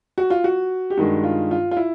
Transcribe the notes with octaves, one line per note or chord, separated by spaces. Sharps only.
F#4
F4
F#4
G4
G2 D#3 G#3 F#4
F4
F4
F4
E4